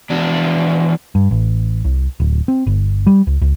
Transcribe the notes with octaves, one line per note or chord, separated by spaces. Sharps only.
E2 D4
G2
A1
C2
D1
C4
G1
G3
C#2
C#2